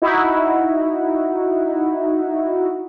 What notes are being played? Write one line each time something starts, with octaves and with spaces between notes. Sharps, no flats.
D#4 E4 F#4